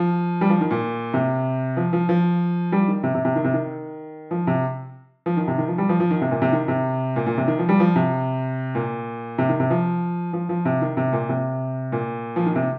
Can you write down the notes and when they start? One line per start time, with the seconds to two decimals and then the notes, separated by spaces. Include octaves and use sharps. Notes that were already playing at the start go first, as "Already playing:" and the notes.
Already playing: F3
0.41 G3
0.50 F3
0.61 D#3
0.71 A#2
1.14 C3
1.77 F3
1.93 F3
2.09 F3
2.72 G3
2.88 D#3
3.03 C3
3.14 C3
3.25 C3
3.35 D#3
3.44 C3
3.53 D#3
4.31 F3
4.47 C3
5.26 F3
5.37 D#3
5.48 C3
5.58 D#3
5.68 F3
5.78 G3
5.89 F3
6.00 F3
6.11 D#3
6.21 C3
6.31 A#2
6.42 C3
6.52 D#3
6.68 C3
7.16 A#2
7.27 A#2
7.38 C3
7.48 D#3
7.59 F3
7.69 G3
7.80 F3
7.96 C3
8.75 A#2
9.38 C3
9.49 D#3
9.60 C3
9.70 F3
10.33 F3
10.49 F3
10.65 C3
10.81 D#3
10.97 C3
11.13 A#2
11.29 C3
11.92 A#2
12.36 F3
12.46 D#3
12.55 C3